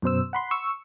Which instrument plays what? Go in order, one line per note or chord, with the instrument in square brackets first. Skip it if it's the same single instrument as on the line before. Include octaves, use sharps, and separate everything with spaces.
[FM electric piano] F#2 B2 C5 E6
F#5 B5 C6
C#6 E6 C#7